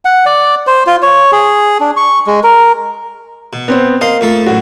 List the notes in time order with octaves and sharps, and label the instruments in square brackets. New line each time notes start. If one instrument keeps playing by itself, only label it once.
[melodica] F#5
D5
C5
F4
C#5
G#4
D4
C#6
G#3
A#4
[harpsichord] B2
[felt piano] B3 C4 C5
[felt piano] A#3 F5 [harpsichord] D#5 C6
[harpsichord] F2 A3 A4
[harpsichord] F#2 A2 [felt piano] F#4